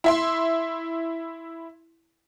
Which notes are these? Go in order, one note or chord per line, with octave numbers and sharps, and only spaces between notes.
E4 E5 C6